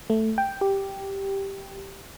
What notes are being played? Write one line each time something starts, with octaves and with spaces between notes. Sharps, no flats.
A3
G5
G4